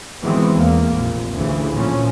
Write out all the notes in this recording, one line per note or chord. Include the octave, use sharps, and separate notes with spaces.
D#3 E3 F#3 G#3 B3 C4
E2 A#3
F1 A#1 A#2
D2 C#3 E3
A#2 F3 C#4